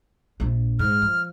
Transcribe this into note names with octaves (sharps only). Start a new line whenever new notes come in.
A#1 D4
G#2 F6
F3